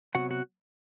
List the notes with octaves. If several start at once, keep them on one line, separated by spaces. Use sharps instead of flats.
C3 F#3 B3 F#4 F#5
F#4 F#5